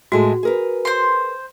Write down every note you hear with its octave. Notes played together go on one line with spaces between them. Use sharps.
A2 G#3 F#4 A4
G#4 A#4 B4
C5 C6